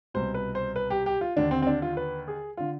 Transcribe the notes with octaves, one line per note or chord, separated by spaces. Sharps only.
C2 B2 C5
B4
C5
B4
G4
G4
F4
D#2 D3 D4
C4
C4
D4
F4
B4
G#4
D3 F4